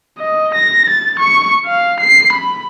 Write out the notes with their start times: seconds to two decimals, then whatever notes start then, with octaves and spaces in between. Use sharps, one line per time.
0.19 D#5
0.55 A#6
0.90 A6
1.20 C#6
1.66 F5
2.00 C7
2.33 B5